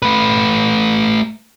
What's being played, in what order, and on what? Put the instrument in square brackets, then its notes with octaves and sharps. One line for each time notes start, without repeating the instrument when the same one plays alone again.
[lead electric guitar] A3 B4